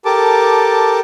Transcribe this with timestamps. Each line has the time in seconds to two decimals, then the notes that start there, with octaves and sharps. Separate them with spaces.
0.05 G4 A4 A#4 A5 D6